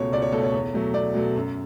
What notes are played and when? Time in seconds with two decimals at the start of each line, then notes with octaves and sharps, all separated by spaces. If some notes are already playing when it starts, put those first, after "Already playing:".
Already playing: C#2 B2 A3 C#5
0.12 C#2 D5
0.22 C#5
0.32 B2 A4
0.37 A3
0.43 C#5
0.54 E2
0.74 B2 F#3 A3
0.94 E2 D5
1.14 B2 F#3 A3
1.35 F#2